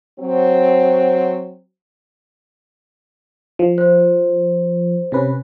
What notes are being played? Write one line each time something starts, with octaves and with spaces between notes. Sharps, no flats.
F#3 C4
F3
C5
C3 C#4 B4